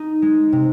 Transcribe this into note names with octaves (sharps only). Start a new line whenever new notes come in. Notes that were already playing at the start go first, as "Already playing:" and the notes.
Already playing: D#4
G#3
C3